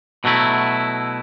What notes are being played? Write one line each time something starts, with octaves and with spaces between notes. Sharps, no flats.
B2 F#3 A3 E4